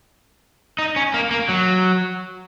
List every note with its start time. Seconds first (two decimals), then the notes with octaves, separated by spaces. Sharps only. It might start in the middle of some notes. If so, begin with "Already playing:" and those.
0.78 D#4
0.96 C#4
1.14 A#3
1.31 A#3
1.49 F#3